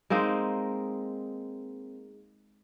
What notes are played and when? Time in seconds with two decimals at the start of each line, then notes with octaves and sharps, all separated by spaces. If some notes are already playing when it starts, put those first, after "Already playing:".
0.10 G#3 A#3 C4 D#4